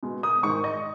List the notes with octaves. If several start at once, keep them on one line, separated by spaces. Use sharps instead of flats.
B2 G#3
D#6
G#2 D#3 G#3 C#6
D#5